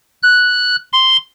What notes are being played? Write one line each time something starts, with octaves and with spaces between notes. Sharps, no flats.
F#6
C6